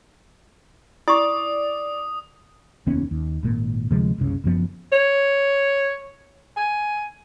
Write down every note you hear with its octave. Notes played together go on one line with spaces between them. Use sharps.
E4 D5 C#6 D#6
F1 D#2 B3 C#4
D#2
G#1 A#2
D2 C3 F3 G#3
F#1 C2 C#3
F#1 F#2 F3 B3
C#5
G#5